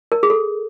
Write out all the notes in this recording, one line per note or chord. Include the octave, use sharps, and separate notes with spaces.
A#4
G#4
A4